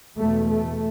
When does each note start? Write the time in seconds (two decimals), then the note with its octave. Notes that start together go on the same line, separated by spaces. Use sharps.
0.18 E2 B2 A3
0.50 A3